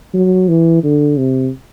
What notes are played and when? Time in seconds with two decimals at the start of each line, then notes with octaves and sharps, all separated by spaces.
0.14 F#3
0.48 E3
0.83 D3
1.18 C3